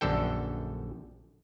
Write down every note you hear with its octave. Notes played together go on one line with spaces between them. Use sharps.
A#1 F#2 D3 A4 G5